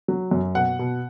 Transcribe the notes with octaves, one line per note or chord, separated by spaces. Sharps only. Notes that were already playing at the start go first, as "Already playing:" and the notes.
F#3
F#2
B2 F#5
B2